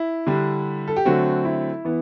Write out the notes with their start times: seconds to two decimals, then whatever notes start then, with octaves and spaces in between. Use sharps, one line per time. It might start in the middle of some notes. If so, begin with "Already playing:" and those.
Already playing: E4
0.27 D3 G3 D4
0.88 A4
0.96 G4
1.05 D3 F#3 A3 C4 F#4
1.45 E4
1.85 E3 B3